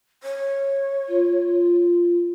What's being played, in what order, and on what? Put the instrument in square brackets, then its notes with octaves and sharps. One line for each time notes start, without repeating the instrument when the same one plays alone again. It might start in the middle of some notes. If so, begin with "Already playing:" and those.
[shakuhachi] C#5
[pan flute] F4